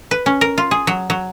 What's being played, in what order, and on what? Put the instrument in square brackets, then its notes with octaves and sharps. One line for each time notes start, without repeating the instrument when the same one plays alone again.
[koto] B4
C#4
A#4
F4
G#4
F#3
F#3